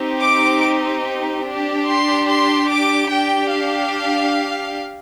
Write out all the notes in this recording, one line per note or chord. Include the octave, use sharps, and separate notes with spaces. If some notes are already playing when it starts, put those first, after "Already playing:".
Already playing: C4 D#4 G4
D6
D4 G4
C6
C6
D6
D4 G4 G5
F5